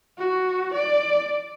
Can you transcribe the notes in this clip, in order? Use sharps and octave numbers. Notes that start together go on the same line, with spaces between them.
F#4
D5